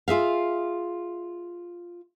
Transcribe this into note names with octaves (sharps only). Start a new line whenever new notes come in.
F4 G#4 E5 F5